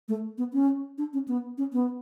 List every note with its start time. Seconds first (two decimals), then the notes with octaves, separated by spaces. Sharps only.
0.08 A3
0.38 B3
0.53 C#4
0.98 D4
1.13 C#4
1.28 B3
1.58 C#4
1.73 B3